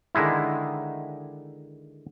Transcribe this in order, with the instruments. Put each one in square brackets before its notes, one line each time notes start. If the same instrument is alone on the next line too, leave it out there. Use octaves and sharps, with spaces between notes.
[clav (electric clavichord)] D3 D#3 G#3 D#4 E4